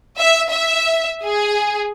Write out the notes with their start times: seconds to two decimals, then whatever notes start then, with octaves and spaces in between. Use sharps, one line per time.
0.19 E5
0.50 E5
1.24 G#4